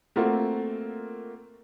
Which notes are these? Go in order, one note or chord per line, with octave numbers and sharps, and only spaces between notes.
A3 A#3 C4 F4 F#4